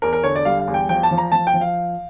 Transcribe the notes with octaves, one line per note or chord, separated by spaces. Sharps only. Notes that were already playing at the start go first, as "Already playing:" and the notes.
E2 A#4
A#4
D3 C#5
D5
G3 F5
F5
E2
G5
F3 G5
A5
F3
A#5
F3 A5
G5
F3
F5